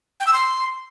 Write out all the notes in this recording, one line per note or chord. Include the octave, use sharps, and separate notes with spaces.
G5
E6
C6